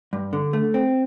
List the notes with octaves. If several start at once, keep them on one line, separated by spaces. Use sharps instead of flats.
G2
D3
A3
C4